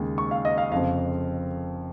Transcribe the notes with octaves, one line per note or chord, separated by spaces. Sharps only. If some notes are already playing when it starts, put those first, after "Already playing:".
Already playing: D#2 C#3 G#3
C#6
F5
D#5
F5
F1 F2 C#3 F3 F5